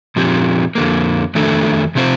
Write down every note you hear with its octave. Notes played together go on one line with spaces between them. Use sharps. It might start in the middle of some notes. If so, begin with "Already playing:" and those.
A#2 F3 C4 G4
F2 D3 F3 A#3
F2 D#3 A3 D4 A4
C3 F3 C4 F4 C5